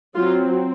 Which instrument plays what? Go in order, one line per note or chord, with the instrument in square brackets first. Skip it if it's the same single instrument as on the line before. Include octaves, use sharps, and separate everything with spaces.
[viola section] F#3 C4 F4